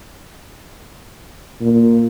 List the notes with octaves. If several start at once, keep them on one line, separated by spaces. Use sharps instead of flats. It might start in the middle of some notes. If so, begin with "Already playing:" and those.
A#2